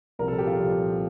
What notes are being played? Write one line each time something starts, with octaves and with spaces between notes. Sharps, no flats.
C2 A#2 F3 A#4
A4
G4
F4
C2 A#2 F3